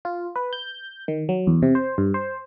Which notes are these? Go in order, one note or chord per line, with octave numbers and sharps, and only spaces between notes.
F4
B4
G6
D#3
F#3
E2
C3
C5
G2
C5